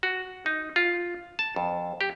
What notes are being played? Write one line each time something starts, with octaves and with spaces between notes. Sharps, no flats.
F#4
D#4
F4
A5
F2
G4